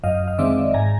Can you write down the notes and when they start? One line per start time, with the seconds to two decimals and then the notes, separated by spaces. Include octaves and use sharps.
0.04 F#2 D#5 F5
0.28 F5
0.38 D#3 G#3 C4 D5 E5
0.74 G#2 G#5 A#5